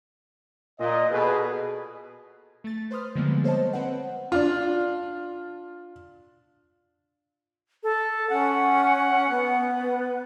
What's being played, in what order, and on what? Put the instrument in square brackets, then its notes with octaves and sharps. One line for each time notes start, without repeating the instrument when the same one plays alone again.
[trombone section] A#2 [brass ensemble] D#5
[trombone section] B2 A4 B4 [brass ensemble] G#4
[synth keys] A3 A6
B4 C5 C6 D#6 F6
D3 F3 G3 G#3 A#3 B3
A4 C5 C#5 D#5 A5
C4 B4 C5 F#5
[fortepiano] D4 F4
[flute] A4
[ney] C#4 [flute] F#5
[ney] B3